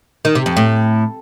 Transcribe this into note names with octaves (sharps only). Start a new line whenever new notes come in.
D#3
C3
F2
A2